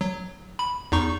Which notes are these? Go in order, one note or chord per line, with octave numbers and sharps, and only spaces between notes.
F#3
B5
E2 D#4 C#6